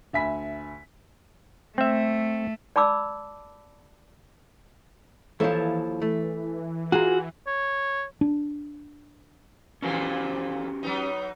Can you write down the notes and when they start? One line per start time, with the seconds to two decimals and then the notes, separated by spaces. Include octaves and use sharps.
0.13 D2 E5 G#5 B5 B6
1.78 A3 C4 E5
2.76 D5 A5 B5 D6 E6
5.40 D#2 E3 F3 E4 A4 C#5
6.02 E3 A3
6.92 F4 F#4 G#4 G#5 A#5
7.47 C#5
8.21 D4
9.82 F2 A#2 E3 C#4 F#4 G4
10.83 F#3 B3 D#4